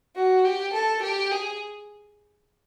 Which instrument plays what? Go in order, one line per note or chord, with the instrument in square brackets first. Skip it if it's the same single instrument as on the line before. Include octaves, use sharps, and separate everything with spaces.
[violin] F#4
G4
A4
G4
G#4